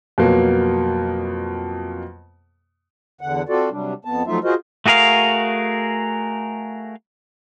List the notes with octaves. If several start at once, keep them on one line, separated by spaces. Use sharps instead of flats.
F2 B2 F#3 A#3 B3
E2 D3 F#5
C4 F4 F#4 A4 D5
C3 F#3 G3 D4
F2 B3 A5
F3 F#3 A3 D#4 F4 E5
F4 F#4 G#4 A#4 C5 D#5
A3 F#4 G#4 A#4 F5